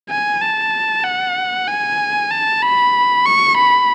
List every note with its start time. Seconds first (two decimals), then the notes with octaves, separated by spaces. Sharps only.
0.09 G#5
0.41 A5
1.04 F#5
1.67 G#5
2.31 A5
2.63 B5
3.26 C#6
3.57 B5